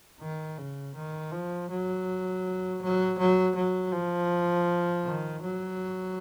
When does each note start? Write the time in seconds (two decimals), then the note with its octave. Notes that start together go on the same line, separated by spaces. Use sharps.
0.20 D#3
0.58 C#3
0.95 D#3
1.32 F3
1.70 F#3
2.82 F#3
3.18 F#3
3.56 F#3
3.93 F3
5.05 D#3
5.42 F#3